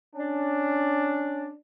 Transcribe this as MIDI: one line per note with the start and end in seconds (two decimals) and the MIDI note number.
0.15 1.49 61
0.15 1.49 62